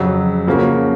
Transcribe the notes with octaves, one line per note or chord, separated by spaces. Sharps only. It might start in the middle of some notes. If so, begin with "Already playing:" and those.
Already playing: F2 C#3 F#3
C#3 F3 A#3 C#4 F#4